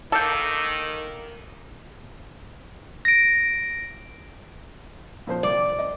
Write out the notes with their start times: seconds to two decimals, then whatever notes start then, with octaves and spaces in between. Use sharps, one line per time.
0.12 D#3 A#3 A4 G6
3.05 A#6 D7
5.27 A#2 F3 C5
5.43 C2 D5
5.79 D#5